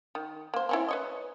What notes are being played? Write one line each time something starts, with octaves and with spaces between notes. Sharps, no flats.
D#3
A#3 C5
C4 C#4 E4
B4 C#5 D#5